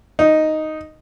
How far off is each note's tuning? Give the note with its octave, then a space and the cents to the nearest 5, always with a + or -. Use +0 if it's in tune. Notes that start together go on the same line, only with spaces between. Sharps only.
D#4 +0